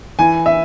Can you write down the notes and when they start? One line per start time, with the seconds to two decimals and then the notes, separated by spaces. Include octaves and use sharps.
0.19 E3 G#5
0.46 E5